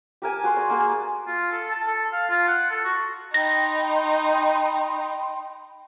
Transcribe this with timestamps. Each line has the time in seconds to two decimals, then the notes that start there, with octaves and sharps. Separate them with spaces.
0.22 G4 A#4 G#5 A5
0.44 F#4 G#4 C6
0.57 D5
0.70 A#3 F#4 G#4
1.27 F4
1.52 A4
1.71 A5
1.88 A4
2.13 F5
2.30 F4
2.48 F#5
2.70 A4
2.85 F#4
3.34 D#4 G5 B5 C6 A#6